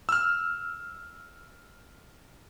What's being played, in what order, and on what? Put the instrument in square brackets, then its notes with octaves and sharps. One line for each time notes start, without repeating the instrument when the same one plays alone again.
[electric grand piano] E6 F6